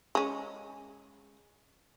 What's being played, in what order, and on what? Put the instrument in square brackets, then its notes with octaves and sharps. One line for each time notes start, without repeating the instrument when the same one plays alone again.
[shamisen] G#3 C#4